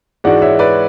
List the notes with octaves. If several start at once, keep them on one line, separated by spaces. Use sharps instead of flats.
G#2 E3 G#3 D4 F#4 D5 F#5
C#5 E5
B4 D5